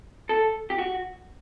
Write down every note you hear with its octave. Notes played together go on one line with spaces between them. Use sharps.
A4
G4
F#4